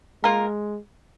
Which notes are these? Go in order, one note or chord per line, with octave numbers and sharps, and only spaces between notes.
G#3 A#3 F4 A#4